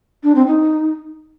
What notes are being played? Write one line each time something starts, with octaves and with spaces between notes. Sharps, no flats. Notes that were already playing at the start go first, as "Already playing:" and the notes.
D4
C4
D#4